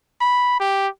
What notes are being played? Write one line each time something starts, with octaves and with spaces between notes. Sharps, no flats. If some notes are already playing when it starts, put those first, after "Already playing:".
B5
G4